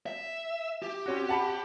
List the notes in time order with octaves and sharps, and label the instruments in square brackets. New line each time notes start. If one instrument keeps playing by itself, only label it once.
[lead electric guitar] E5
G4
[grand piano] C4 C#4 F#4
F#5 A5 B5